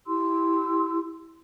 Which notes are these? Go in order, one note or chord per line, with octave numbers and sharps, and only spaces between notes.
E4 G4 C6 E6